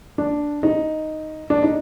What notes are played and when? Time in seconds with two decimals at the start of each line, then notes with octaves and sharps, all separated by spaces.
0.18 D4
0.63 D#4
1.50 D4
1.63 D#4